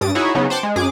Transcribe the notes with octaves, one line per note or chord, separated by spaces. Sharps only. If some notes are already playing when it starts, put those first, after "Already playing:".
G2 D#6 A6 D7
D#4 E4 F#4 G#4 C#5
C#3 F#3 B3 D#4
C5 F#5 G5 A5 C6 D6
G#3
F#2 G#4 D6